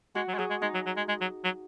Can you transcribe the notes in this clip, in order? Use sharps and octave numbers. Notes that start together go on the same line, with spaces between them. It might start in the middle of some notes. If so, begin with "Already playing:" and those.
G#3 F#4
F#3
G#3
F#3 G#4
G#3
G#3 D#4
F#3
F#3
G#3
G#3
F#3
F#3